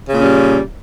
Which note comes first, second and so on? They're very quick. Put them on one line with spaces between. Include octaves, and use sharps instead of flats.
C#3 A#2 C#4 G3